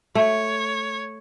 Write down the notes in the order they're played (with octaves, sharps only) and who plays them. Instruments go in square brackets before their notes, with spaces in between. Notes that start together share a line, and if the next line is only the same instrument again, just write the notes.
[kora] A3 [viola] C#5